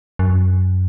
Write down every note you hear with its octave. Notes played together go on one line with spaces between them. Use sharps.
F#2